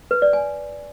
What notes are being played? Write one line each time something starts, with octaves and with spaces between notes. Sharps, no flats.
B4
D5
G#5